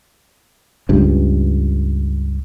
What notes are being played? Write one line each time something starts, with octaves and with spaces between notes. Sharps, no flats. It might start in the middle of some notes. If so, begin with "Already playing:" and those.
C#2 G2